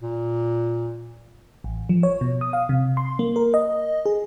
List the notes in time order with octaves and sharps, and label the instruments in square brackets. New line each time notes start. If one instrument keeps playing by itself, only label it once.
[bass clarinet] A#2
[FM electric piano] A1
F3
C#5
B2
D#6
F5
C3
C6
A#3
A#4
D#5
G#4